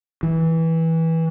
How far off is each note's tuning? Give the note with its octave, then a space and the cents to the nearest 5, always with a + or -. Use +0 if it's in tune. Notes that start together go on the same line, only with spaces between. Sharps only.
E3 -15